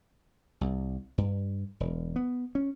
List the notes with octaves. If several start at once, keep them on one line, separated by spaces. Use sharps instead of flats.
C2
G2
E1
B3
C#4